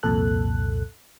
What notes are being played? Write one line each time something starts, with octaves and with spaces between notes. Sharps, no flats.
C2 F2 A#2 A4 F#6